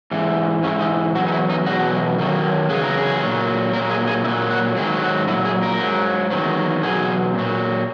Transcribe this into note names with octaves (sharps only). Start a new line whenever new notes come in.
G#2 E3
G#2 E3 C#4
D#4
E2 B2 F#3 F#4
D#4
E4
D#4
E2 B2 F#3 F#4
F#2 D#3 F#3
E2 C#3 F#3 G#4
A#4
G#4
A#2 F#3
A#2 F#3 A#4
G#4
G#4
A#2 F#3 E4
F#4
G#2 D#3 F#3 G#4
F#4
A#2 F#3 E4
G#4
A#4
G#2 F#3
E2 D#3 F#3
E2 B2 F#3 G#4
A#2 F#3